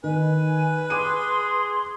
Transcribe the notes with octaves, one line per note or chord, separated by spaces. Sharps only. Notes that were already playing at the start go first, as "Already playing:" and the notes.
D#3 B4 G#5
G#4 C6 D6 D#7